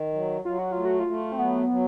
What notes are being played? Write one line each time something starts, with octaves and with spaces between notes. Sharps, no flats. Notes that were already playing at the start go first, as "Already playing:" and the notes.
Already playing: D#3
F#3
F#3 F4
F#4
A3 F4
F#4
F4
A3
C4
F#3 B3
F#3